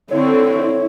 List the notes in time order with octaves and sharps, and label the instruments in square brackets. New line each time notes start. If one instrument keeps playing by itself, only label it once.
[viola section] D3 C4 [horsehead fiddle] E4 [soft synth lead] C#5